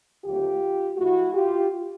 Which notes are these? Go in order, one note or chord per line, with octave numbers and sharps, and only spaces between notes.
D#2 D3 F#3 A3 C4 F4 G4
A2 F3 A3 E4 F#4
F4 G4